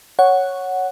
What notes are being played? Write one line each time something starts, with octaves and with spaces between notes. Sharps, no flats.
C#5 F#5